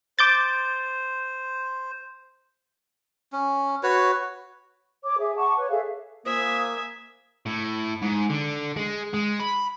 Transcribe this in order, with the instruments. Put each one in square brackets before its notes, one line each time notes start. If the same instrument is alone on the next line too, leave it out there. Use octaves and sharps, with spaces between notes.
[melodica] C5 [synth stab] D6 G6 A6
[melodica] C#4
F#4 B4 C#5
[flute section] C#5 D6
G#4 E5
F#5 A5 C#6 D6
B4 C#5
G#4 A4 E5 F5
[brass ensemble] A#3 [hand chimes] F4 C5 [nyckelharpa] E5 G#5 [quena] D#6
[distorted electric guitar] A2
G#2
D3
G#3
G#3
B5